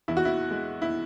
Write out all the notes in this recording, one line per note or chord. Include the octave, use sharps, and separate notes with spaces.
E2 E4
F#4
E4
G#3
E4